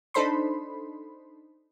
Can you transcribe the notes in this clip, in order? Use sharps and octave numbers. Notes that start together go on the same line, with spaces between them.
D4 D#4 A4 C5 B5 C6